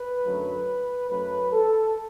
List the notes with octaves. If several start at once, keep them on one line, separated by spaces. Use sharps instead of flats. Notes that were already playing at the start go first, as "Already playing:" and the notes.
Already playing: B4
F#2 D3 F#3 A3
F#2 F#3 A3 B4
A4